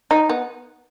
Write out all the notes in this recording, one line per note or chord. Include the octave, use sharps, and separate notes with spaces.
D#4
B3